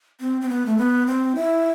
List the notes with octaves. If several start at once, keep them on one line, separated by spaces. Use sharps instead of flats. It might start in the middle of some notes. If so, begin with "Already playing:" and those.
C4
C4
B3
A3
B3
C4
E4